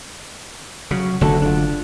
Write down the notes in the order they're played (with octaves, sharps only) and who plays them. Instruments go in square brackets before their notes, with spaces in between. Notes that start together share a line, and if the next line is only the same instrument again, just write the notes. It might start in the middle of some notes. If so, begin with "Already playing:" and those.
[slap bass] C#3 [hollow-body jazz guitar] F#3
[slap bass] F#1 D3 A3 [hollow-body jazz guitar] D4 F#4 A4
[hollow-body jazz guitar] D4 F4